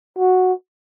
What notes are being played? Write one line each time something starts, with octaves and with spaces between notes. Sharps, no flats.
F#4